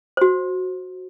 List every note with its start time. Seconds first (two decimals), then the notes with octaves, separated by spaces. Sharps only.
0.17 F#4 C5